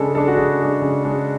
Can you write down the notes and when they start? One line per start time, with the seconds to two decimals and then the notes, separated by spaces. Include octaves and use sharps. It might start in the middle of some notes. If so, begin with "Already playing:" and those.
Already playing: C#3 G#3 D4 A4
0.15 G#3 D4 A4
0.28 F#4
0.37 C#3 G#4
0.60 G#3 D4
0.82 C#3
1.05 G#3 D4